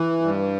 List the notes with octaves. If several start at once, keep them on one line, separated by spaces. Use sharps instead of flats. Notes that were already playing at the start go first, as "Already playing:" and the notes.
Already playing: E3
G2